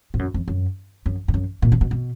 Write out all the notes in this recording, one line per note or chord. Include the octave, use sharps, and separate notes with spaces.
G#2
F#2
F2
F#2
F#2
G#2
F#2
A#2
D3
B2
B2